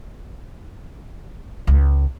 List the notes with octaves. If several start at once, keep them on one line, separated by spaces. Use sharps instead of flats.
C#2